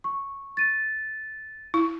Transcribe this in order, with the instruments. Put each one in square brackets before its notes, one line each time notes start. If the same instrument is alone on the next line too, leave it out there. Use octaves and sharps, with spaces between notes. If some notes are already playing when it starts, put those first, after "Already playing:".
[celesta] C#6
A6 D#7
[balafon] E4